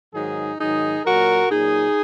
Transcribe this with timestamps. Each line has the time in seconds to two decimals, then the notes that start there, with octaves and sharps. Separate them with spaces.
0.14 G#2 D#3 F#3 D#4 G#4
0.59 G#2 D#3 F#3 D#4 G#4
1.05 A#2 F#3 F#4 A#4
1.50 A#2 F#3 D#4 G#4